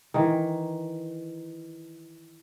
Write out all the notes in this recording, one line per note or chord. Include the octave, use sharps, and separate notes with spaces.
D#3 E3